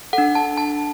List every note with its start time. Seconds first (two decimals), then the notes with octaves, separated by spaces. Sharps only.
0.13 A4 F#5
0.18 D4
0.35 A5
0.58 A5